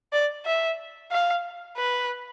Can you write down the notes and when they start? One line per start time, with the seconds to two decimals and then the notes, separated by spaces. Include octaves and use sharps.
0.13 D5
0.46 E5
1.12 F5
1.77 B4